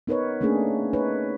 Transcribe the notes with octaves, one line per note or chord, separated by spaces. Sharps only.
B3 D#4 A#4 B4 C#5
A3 A#3 C#4 D4 G#4
D#4 B4 C#5